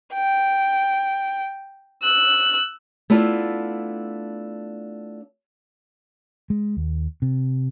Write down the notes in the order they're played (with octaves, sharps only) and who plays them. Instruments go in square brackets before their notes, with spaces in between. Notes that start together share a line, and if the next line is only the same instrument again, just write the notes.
[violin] G5
E6 F#6
[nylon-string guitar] A3 B3 D4 E4 F4
[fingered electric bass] G#3
D#2
C3